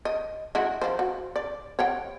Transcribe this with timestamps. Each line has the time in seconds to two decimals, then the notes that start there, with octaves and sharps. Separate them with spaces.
0.05 D#5
0.55 G#3 E4 F#4
0.82 F3 C5
0.99 F#4
1.36 D5
1.79 C#5 F#5 G5